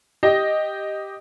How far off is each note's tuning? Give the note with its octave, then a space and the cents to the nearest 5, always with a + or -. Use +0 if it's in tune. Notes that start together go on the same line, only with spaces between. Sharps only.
G4 +0 D#5 +0